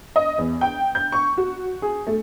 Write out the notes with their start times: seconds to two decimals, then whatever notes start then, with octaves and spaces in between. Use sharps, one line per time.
0.16 D#5
0.38 E2
0.61 G5
0.95 G6
1.12 C#6
1.37 F#4
1.82 G#4
2.07 A3